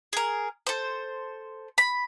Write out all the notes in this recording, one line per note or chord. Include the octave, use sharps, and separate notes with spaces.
G#4 A#4
A4 C5
B5